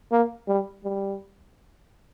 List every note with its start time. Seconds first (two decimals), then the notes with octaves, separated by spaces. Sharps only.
0.12 A#3
0.48 G3
0.84 G3